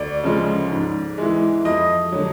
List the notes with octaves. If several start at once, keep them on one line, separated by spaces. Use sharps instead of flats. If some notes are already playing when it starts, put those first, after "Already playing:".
Already playing: D2 D5
C#3 F3 G#3
G#2
E3 G#3
F2 D#5
D3 F#3